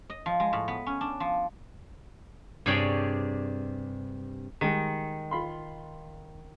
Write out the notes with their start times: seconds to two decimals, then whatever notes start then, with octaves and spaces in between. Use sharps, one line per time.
0.10 D#5
0.26 F3
0.40 G#3
0.53 A2
0.68 B3
0.86 C#4
1.01 D4
1.20 F3
2.66 G2 C3 G#4 C#5 D5 G5
4.61 D#3 G3 G#3
5.31 F4 B5 C6